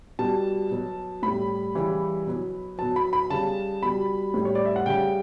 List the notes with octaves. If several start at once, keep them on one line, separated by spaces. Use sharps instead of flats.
B2 G3 A5
B2 F#3
A2 G3 B5
C#3 E3 G3
B2 F#3
B2 F#3 A5
B5
B5
C#3 G3 A5
B2 G3 B5
A2 G3
C#5
D5
E5
F#5
C#3 G3 G5